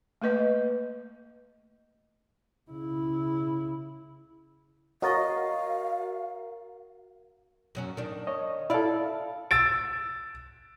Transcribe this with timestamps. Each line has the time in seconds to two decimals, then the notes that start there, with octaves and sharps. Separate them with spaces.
0.22 A3 A#3 B4 D#5
2.69 C#3 E4
5.02 F#4 A#4 C#5 D#5 F5 C#6 A6
7.75 F#2 F#3 C#4
7.97 D#3 D4
8.27 C#5 D#5
8.70 E4 A4 D5 F5
9.51 E6 A6 D7